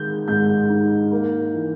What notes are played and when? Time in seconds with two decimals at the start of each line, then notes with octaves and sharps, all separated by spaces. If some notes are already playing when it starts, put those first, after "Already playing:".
Already playing: D#3 G#3 G6
0.28 G#2 G6
0.70 D#4
1.11 A#3
1.53 E3